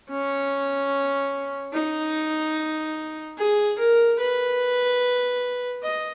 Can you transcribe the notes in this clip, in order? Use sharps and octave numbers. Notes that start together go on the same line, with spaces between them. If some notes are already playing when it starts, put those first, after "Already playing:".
C#4
D#4
G#4
A#4
B4
D#5